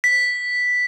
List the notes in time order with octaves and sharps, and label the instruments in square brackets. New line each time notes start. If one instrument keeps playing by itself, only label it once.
[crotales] B6